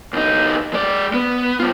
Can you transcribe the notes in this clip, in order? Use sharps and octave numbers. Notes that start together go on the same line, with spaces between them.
C2 D#4
G#3 D5
B3
G3 F4